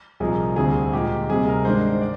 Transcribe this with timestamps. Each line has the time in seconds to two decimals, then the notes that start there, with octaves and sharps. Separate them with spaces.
0.20 C2 A#2 F3 A#3 D#4 G#4
0.56 D2 D3 G3 C4 G#4
0.93 A#2 G#3 D#4 G4
1.28 D2 C3 G3 C4 D#4 G#4
1.48 A#4
1.65 G#2 D#3 G#3 D4 C5
2.01 D5